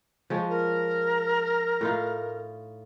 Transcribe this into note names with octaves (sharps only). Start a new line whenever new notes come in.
F3 G#3 C#5
A#4
A2 D#4 F4